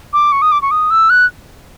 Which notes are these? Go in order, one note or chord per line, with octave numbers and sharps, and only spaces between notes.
D6
C#6
D#6
D6
C#6
D#6
E6
F#6